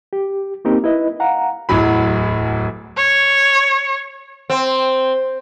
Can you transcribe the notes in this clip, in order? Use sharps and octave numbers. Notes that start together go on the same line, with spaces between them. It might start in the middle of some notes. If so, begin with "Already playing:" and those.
G4
A#3 C4 D#4 G4 A#4
E4 B4 D#5
F5 F#5 A#5
D1 E2 F#3 B5
C#5
C4